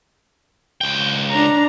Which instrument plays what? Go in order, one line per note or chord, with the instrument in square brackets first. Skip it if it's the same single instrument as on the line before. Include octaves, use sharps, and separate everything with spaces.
[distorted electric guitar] C#2 G5
[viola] D4 A#5